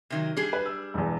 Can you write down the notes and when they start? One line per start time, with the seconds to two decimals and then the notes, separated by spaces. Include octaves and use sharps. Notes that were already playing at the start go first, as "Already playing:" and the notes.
0.10 C3 D#3 F#3
0.37 G3 D4 G#4
0.53 B4
0.66 E6
0.94 E1 E2